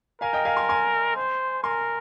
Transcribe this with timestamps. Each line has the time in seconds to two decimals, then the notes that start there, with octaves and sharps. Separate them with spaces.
0.21 A#4 F5 G#5
0.33 D#5 G5
0.45 F5 G#5
0.57 G#5 C6
0.69 G#5 C6
1.16 C5
1.63 A#4 G#5 C6